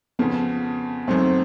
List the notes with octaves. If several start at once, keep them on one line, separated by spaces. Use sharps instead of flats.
F2 C#3 F3 B3
F#2 D#3 F#3 A3 C4